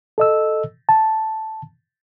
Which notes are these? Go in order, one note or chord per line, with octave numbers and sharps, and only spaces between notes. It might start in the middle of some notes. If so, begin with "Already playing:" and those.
A4 D#5 E6
A5